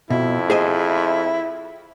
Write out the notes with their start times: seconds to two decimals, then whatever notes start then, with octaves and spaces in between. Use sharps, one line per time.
0.10 F2 B2 E4
0.50 G#4 C5 D#5